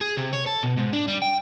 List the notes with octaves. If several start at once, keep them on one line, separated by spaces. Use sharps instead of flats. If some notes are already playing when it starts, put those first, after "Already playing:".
G#4
C3
C#5
A4
B2
G#2
D4
G3
G5